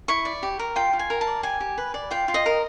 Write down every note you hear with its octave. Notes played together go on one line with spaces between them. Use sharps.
E4 C#6
D5
G4
A#4
F4 G5
F4
G#5
A#4
A5
D5
G4 G#5
G4
B4
D5
F4 G5
F4
D#5
A#4